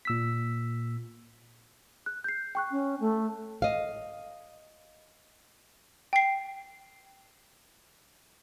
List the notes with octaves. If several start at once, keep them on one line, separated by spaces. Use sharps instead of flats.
A#2 E6 B6
F#6
G6 C7
G5 C#6 F#6
C#4
A3
D#5 F5
G5 C7